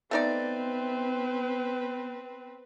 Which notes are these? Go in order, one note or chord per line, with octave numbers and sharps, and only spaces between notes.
A3 B3 C4 D#4 B4 D5